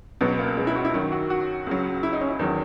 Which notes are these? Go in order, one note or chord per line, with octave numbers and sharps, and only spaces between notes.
C#2 B2 F#3 B3
A#3
G#3
E4
F#4
E4
F#2 D#3 F#3
F#4
F#4
C#2 C#3 F#3
E4
D#4
C#4
E4
E2 D#3 F#3